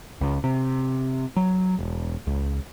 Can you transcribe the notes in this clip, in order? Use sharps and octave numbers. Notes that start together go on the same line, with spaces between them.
C#2
C3
F#3
E1
C#2